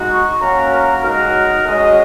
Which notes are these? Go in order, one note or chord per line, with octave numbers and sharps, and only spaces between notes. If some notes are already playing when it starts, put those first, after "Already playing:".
Already playing: G#3 D#4 F#4
C#6
A#3 C#4 F#4 A#5
A#4
G#3 D#4 F#4 A#4
G#3 C#4 F#4 D#5